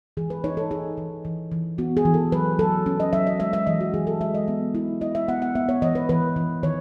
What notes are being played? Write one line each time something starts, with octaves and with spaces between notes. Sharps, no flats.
E3 G#4
B4
D#4 C#5
A4
D#4 G#4
E3
E3
E3
B3 F#4
G#4
E3
A4
F#3 B4
F#3 A4
C#4
D#5
F#3 E5
D#5
G#3 E5
E5
E3 D#5
F#4
E3 G#4
A4
G#3 E5
D#5
B3 E5
E4
E4 D#5
E5
B3 F#5
F#5
B3 E5
C#5
E3 D#5
B4
E3 B4
E3
D#3 C#5